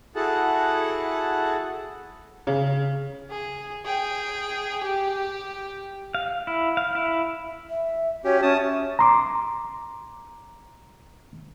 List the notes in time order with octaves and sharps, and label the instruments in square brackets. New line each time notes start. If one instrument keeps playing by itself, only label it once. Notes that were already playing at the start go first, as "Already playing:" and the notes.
[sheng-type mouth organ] E4 F#4 G#4 A4 F#5 A5
[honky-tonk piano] C#3
[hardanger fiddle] G#4
G#4 G5
G4
[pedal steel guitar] F5
E4
F5
E4
[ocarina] E5
[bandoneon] C#4 G4 [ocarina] F#4 [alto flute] C#5
[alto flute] C#4 [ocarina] E5 [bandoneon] A5 D#6
[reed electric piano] A#5 C6 D6